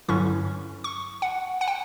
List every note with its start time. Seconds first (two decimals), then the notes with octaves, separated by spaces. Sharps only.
0.08 G2 D3 F#3 C#4 E4 C#6
0.84 C#6
1.22 F#5
1.61 F#5
1.68 G5